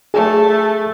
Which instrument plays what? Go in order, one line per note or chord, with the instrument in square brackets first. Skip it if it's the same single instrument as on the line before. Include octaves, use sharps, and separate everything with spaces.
[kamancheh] A3 [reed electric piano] G#4